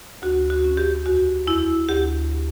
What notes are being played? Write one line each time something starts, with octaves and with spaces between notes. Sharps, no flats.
D2 F#4
F#4
C#4
G4
E2 F#4
E2 E4
D2 G4